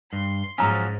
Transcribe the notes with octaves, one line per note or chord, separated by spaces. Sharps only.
G2 C6
G#2 F3 F#3 C#4 G#5 A#5 F6